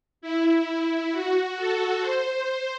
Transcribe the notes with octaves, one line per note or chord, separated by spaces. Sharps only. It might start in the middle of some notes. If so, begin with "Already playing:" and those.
E4
F#4
A4
C5
C5